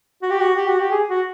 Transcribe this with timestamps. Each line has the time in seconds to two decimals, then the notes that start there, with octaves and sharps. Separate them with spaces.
0.22 F#4
0.30 G4
0.40 F#4
0.56 G4
0.68 F#4
0.80 G4
0.91 G#4
1.09 F#4